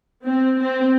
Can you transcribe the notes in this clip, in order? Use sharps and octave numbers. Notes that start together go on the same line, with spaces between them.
C4
C4